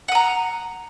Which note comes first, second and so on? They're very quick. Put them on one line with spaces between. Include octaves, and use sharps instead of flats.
F#5 D#6 A#5